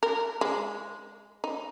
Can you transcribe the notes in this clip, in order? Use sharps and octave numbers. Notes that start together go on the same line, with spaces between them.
A#4
G#3
D#4